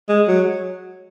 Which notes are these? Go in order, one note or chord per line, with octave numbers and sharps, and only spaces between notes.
G#3
F#3